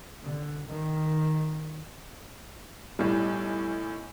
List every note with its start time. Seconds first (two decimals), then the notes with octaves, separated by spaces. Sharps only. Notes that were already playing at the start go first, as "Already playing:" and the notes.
0.23 D3
0.67 D#3
2.99 B1 A2 G3